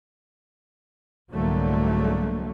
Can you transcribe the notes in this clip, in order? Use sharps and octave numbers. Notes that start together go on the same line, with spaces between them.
C2 G#2 D3 F#3 A3 A#3